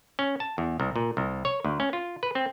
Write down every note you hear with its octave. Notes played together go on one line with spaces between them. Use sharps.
C#4
A5
E2
C2
A#2
C2
C#5
D2
C#4
F4
B4
C4